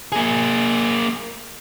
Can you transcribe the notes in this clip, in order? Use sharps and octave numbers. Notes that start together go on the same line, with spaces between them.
A#3 G#4